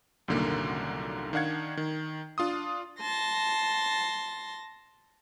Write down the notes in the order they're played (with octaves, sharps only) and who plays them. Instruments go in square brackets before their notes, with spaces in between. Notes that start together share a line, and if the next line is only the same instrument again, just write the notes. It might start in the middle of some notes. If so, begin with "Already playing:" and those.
[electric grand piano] C2 F#2 A#2 D3 D#3 A#3
D#3 D4 F5 F#5 G#6
D#3
D4 F4 C6 D#6
[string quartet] A5 C6 A#6